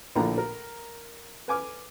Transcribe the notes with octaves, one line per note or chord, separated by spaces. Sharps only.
A#1 A2 D3 F3 A#3 A#5
A#4
B4 G#5 D6 F6